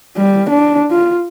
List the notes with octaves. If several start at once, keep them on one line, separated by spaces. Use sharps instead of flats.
G3
D4
F4